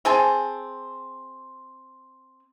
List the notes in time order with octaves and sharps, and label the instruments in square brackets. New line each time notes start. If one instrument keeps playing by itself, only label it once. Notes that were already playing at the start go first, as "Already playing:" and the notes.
[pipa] C4 G#4 G#5 A5